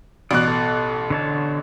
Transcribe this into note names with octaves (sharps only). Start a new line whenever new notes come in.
A1 B2 D5 F#6
A4
D3 C#5 A5